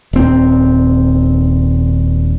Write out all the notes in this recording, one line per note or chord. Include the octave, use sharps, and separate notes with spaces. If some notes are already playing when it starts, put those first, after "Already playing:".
D#1 C4